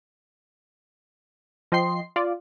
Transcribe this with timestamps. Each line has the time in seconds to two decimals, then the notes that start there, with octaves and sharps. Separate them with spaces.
1.72 F3 D#5 G5 C6 C7
2.16 F4 D5